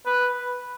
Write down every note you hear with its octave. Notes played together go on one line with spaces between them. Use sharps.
B4